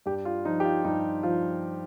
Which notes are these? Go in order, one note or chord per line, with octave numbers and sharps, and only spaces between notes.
G2 G4
F4
F3 D#4
G4
F4
G2 D#4
F3 F4